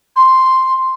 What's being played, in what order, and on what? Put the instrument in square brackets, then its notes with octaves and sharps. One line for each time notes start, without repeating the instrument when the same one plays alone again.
[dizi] C6